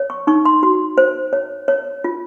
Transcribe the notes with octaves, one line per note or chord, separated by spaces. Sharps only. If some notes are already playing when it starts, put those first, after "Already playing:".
Already playing: C#5
C#6
D#4 C#6
C6
F#4 C6
C5
C#5
C#5
F4